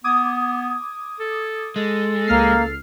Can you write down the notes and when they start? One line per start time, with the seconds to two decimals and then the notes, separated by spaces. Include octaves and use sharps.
0.04 B3 D6 D#6 G#6
1.20 A4
1.76 G#3 A4
2.27 C#2 A#3 F6 C7